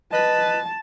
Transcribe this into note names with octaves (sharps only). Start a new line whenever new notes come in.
B4 D#5 A5